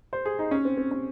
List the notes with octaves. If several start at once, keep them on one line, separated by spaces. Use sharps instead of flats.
C5
G#4
D#4
C#4
C4
C4
C#4